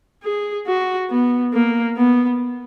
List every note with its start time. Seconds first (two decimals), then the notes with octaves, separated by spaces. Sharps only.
0.24 G#4
0.67 F#4
1.11 B3
1.53 A#3
1.97 B3